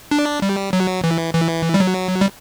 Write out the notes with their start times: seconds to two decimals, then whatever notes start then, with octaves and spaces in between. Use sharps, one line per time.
0.11 D4
0.42 G3
0.73 F#3
1.04 E3
1.34 E3
1.74 G3
1.80 F#3
2.21 G3